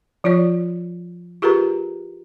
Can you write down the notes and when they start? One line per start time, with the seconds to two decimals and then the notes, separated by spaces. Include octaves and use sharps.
0.24 F3 F4 C#5 D5
1.42 F4 G4 G#4 A#4 B4 A#5